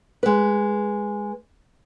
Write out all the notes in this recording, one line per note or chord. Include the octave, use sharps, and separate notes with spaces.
G#3 B4